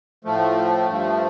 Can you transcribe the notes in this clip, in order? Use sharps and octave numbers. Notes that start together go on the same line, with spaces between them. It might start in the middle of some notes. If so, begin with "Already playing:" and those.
A2 F3 A3
G2 F3